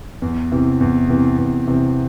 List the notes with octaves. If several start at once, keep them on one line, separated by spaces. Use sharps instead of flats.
E2
C3 E3
E2
C3 E3
E2
C3 E3